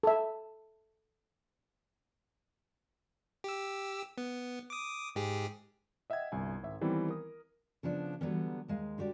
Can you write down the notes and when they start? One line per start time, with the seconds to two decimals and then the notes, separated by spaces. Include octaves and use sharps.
0.03 A4 E5
3.44 G4 E6
4.18 B3
4.70 D6 D#6
5.16 G#2 G4 G#4
6.10 D#5 E5 F#5 G5 G#6
6.32 G1 C2 G#5
6.63 G#1 E5
6.81 D#3 E3 G3 B3 C4 E4
7.09 A#4 D#6
7.83 C#3 F3 B3 D4
8.21 D3 E3 F#3 G3 B3 C#4
8.68 D#2 G#3 F5
8.98 D3 F#4 G4 D5